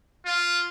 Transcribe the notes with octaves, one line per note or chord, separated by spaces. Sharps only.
F4